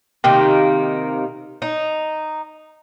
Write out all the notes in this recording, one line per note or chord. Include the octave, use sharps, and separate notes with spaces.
C3 D#3 A#3 G5
D#4